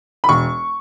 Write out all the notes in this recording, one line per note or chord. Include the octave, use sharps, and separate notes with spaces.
B5
E1 C#6